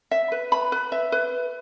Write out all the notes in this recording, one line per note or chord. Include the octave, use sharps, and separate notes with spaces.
E5
B4
B5
B4
E5
B4